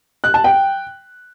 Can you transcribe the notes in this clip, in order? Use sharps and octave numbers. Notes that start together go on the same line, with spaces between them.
F#6
A5
G5